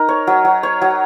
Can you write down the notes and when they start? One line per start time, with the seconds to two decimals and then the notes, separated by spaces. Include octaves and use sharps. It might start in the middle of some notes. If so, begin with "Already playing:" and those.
Already playing: D#4 A#4
0.09 C#5
0.27 F#3
0.45 F#3
0.63 C#5
0.82 F#3